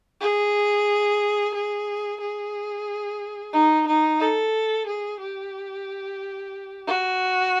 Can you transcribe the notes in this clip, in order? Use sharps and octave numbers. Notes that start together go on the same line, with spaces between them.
G#4
G#4
G#4
D#4
D#4
A4
G#4
G4
F#4